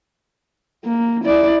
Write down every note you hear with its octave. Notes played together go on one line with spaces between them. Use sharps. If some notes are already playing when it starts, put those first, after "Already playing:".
A#3
E4 D5